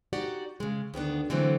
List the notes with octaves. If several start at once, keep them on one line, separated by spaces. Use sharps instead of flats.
D#4 F#4 G4 D5 F#5
C#3 G#3
D2 D#3 B3 D4
D3 E3 F#3 A3 B3 C4